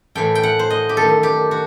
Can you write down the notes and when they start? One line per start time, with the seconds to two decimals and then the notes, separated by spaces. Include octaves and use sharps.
0.15 A2 E3 A3 G5
0.35 G5
0.43 F#5
0.59 C5
0.70 D#5
0.89 G4
0.97 F#2 D#3 A3 A4
1.23 G4
1.51 F#4